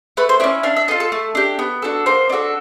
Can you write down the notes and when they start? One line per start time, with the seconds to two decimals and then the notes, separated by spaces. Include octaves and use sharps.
0.17 A3 B4
0.29 C5
0.40 E4 D5
0.44 C#4
0.63 D4 F5
0.77 E5
0.88 F4 A4 D#5
1.00 A4
1.12 A3
1.35 D4 G4
1.59 B3
1.82 D4 F#4 A4
2.06 A#3 C5
2.30 D4 F#4 A4